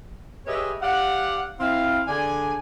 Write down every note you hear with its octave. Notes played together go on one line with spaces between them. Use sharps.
G4 G#4 B4 C#5 D#5 E5
G4 D5 F5 F#5
C4 E4 F5
D3 D4 G#4 G#5